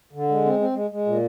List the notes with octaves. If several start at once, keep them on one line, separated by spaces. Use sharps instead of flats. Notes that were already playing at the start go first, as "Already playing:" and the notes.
D3
G#3
C4
C4
G#3
G#3
A#2